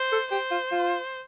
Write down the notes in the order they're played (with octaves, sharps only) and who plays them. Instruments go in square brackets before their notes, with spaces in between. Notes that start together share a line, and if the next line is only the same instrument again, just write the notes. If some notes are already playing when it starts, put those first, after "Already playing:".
Already playing: [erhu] C5
[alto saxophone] A4
[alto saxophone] G4 [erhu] C5
[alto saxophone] F4
F4